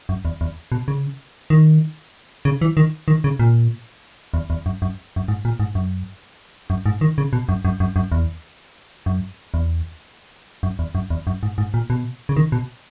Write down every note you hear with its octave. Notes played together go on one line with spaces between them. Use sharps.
F#2
E2
E2
B2
C#3
D#3
C#3
E3
D#3
D#3
C#3
A#2
E2
E2
F#2
F#2
F#2
G#2
A#2
G#2
F#2
F#2
G#2
D#3
C#3
B2
F#2
F#2
F#2
F#2
E2
F#2
E2
F#2
E2
F#2
E2
F#2
G#2
G#2
A#2
B2
C#3
D#3
B2